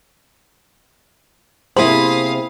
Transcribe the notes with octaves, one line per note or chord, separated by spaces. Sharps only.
C3 A#3 E4 G#4 C5 F5 B5 D#6